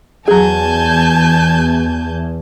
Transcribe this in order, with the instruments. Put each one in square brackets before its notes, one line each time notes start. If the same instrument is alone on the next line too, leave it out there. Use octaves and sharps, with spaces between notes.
[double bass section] E2 [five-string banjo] F#3 G#4 [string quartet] G#5 A5 G6